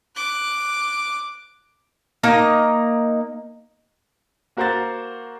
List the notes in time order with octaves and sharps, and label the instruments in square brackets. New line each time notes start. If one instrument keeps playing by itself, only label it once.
[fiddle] D6 F#6
[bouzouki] A#3 D#4 D#5
[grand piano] A#3 F#4 A#4 C5 F#5 A6